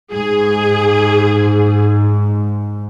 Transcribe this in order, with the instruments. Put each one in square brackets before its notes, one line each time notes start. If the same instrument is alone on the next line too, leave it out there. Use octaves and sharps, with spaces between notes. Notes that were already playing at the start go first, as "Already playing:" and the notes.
[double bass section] G#2 [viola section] G#4